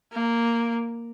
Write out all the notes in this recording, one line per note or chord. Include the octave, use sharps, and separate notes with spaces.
A#3